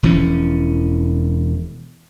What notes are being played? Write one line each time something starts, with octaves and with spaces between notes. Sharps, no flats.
E1 E3 F3 C#4